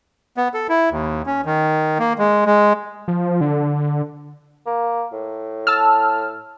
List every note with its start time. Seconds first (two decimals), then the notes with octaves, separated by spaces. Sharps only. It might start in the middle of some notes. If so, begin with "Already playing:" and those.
0.37 B3
0.54 A4
0.69 E4
0.91 D#2
1.26 C#4
1.45 D#3
1.99 A#3
2.18 G#3
2.46 G#3
3.08 F3
3.41 D3
4.66 A#3
5.12 A2
5.67 A5 E6 F6